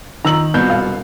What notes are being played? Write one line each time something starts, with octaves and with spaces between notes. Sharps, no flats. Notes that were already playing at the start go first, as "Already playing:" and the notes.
D#3 A#5 E6 F#7
C2 B2 G6
E1 F5